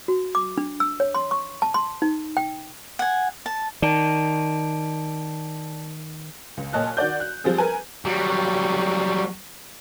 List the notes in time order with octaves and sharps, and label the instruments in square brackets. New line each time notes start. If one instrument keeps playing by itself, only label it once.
[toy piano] F#4
D6
D4
E6
C#5
C6
C#6
A5
C6
D#4
G5
[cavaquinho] F#5 G#5
A5
[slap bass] D#3 [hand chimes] D5 A5
[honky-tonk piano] C#2
A#2 C#5 D#5 A5 F#6
D#3 F#4 D5 G6
F#6
F3 G3 C4 G#4
A#4 B4 G#5
[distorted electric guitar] F#3 G3